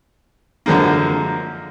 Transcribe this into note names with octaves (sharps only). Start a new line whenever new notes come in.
F#2 D3 F3 G#3 A#3